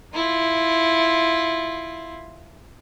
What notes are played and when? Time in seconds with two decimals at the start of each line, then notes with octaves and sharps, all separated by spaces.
0.14 E4 F4